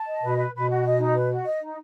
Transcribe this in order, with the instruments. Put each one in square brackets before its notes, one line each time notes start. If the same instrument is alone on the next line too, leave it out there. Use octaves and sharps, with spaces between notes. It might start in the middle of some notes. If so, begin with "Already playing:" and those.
Already playing: [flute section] A5
D#5
[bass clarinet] B2 [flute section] B4
[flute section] B4
[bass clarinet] B2 [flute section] B4
[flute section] F#4
D#5
D#4
B4
F#4
D#5
D#4